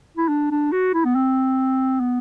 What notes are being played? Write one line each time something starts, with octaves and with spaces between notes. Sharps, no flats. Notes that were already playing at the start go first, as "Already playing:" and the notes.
E4
D4
D4
F#4
E4
B3
C4
B3